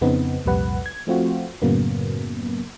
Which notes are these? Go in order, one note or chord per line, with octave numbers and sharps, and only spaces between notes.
F2 C#3 B3 C4 D#4
C2 F2 A#2 G3 B4 F#5
G#6
F3 A3 C4 F4 F#4
F#2 A2 C#3 F#3 A#3 B3